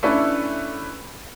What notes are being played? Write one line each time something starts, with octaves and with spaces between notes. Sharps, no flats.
A3 C#4 D4 E4 A4 B4